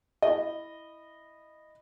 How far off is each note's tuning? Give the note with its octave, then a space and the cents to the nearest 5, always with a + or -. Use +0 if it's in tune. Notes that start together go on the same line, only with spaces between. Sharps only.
E4 -5 D#5 -15